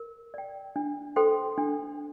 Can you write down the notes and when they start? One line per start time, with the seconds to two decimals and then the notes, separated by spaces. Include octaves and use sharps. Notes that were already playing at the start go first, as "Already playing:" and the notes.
Already playing: A#4
0.34 D5 G5
0.76 D4
1.16 A4 C5 G5 C6
1.58 D4